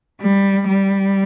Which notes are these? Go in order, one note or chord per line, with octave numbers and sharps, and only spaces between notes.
G3
G3